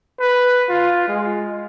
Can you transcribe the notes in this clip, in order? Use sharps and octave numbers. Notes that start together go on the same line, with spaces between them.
B4
F4
G#3